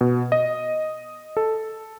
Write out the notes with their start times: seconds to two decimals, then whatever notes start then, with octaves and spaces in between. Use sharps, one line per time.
0.01 B2
0.32 D#5
1.37 A4